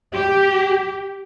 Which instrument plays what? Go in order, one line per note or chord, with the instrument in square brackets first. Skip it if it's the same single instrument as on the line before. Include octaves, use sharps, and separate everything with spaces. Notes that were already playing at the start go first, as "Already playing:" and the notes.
[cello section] G4